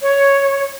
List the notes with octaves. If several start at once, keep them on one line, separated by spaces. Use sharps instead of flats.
C#5